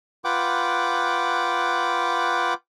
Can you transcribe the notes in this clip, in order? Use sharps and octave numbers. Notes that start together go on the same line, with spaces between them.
F4 B4 F#5 G5 D6